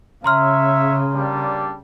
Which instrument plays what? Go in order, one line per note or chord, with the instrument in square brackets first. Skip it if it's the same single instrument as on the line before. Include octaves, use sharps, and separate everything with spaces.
[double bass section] C#3 [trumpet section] C#5 E5 [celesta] A#5 C6 F6
[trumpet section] G3 A#3 D4